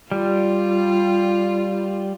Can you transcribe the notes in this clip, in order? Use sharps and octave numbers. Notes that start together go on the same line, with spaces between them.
G3 F4